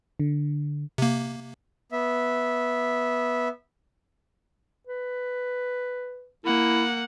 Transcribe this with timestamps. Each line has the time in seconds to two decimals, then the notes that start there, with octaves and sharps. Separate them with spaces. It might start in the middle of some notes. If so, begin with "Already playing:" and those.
0.20 D3
0.98 C3 A#3
1.92 B3 E5
4.87 B4
6.45 A#3 E4 F#5